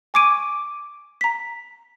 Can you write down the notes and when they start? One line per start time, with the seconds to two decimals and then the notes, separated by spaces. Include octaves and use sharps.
0.14 G#5 C#6 D6 G#6 D7 D#7
1.21 A#5 B6